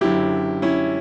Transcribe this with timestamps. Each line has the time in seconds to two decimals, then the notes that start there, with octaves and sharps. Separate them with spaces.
0.01 F#1 F#2 D3 F#3 E4 G4
0.62 C#4 E4